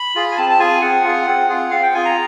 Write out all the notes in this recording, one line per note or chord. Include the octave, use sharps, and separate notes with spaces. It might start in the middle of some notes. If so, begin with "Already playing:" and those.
Already playing: B5
F4 G#4
G#5
C4 A5
A5
F4 G#4 G#5
C4 F#5
F4 G#4
C4
F4 G#4
C4 F5
G5
F4 G#4 G#5
A#5